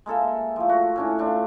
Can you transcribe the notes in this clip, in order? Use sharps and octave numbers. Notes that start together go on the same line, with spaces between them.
G#3 A#3 A4 E5
F3 A3
F#4
A2 C#4 D4
A3 D4 F4